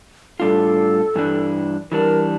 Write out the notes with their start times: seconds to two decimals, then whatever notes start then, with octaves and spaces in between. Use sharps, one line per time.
0.40 A2 G3 D4 F4 A4
1.15 G2 E3 G3 D4
1.91 E3 G3 D4 A#4